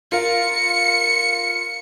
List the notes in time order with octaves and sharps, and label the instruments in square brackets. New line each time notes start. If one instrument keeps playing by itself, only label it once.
[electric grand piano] F4 A#4 F5 [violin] C#7